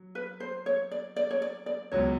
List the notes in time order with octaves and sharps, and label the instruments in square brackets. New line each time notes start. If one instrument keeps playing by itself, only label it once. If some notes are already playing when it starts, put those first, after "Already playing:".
Already playing: [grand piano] F#3
[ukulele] B4
C5
C#5
D5
D5
C#5
D5
D5
[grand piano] C#2 B2 F#3 [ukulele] C#5